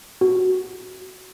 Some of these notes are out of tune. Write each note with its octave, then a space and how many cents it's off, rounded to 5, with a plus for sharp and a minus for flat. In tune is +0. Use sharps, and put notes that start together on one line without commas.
F#4 +5